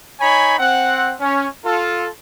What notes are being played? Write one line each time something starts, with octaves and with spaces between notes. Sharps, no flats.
D#4 C#5 G#5 B5
C4 F#5
C#4
F4 A4